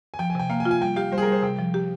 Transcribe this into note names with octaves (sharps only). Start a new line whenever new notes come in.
G#5
F3 G5
G#5
C3 G5
A#3 F5
G#5
F4
G#5
G3 G5
G4 F5
G3 C5
G#4
A#4
G3 C5
C3 G5
F3
G4